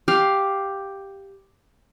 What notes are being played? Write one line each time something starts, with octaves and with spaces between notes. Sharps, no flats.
G4 F5